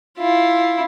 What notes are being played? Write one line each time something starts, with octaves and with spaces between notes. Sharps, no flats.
E4 F4